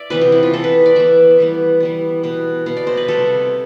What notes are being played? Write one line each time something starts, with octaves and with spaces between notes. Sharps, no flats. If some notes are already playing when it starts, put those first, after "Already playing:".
Already playing: D5 E5
C3 E3 B3 B4
G4
E4
F4
E3 B3 A4
B4
D5
E3 B3 E5
E3 G3 B3
E3 G3 B3
B2 B3
B2 B3 F5
D5
C5
B4
C3 G3 B3 A4